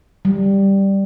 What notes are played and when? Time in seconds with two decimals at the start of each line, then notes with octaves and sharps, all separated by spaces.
0.25 G3